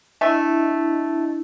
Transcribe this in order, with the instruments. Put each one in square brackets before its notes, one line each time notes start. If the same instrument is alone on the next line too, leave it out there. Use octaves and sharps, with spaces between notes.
[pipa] A3 E5 [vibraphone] D4 E4 D#5